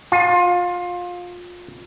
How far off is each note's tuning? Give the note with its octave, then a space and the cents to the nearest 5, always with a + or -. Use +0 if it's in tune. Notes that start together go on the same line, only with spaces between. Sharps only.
F4 +20